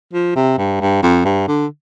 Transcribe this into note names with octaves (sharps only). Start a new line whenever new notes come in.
F3
C3
G2
G2
F2
G2
D3